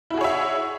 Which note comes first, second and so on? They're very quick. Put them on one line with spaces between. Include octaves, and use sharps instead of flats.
E4 F#4 G#4 C#5 E5